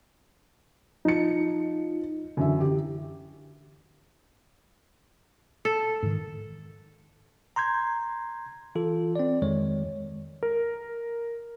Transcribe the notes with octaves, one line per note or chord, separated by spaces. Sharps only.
F3 D#4 C#7
F#2 D3 E3 E5
G4
A4
G#2 D#3
A#5 C6 G6 G#6
E3 F4 A4
C4 D5
F2 D#3 G#3 C#5
A#4